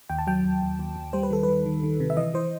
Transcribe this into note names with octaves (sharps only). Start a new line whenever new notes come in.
D#2 G5
A5
F#3 G5
D#2
D#2
D#2
D#2
G3 C5
B4
D#3 A4
D#3 B4
D#3
D#3
C3
E5
E3 D#5
E3 C5